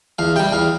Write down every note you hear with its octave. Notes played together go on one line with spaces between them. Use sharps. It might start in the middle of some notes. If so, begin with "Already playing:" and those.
E2 F5
C3 G3 G5
E2 F5